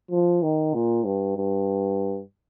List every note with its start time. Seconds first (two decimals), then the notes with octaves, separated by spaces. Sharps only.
0.11 F3
0.43 D#3
0.74 A#2
1.05 G2
1.37 G2